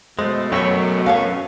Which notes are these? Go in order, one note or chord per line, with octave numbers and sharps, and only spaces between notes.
B2 G#3 A3 C5
F#2 F#3 A3 B3 C#5 G5
C#4 A4 F5